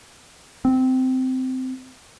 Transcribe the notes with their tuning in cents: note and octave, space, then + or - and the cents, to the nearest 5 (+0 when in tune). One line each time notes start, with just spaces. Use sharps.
C4 -15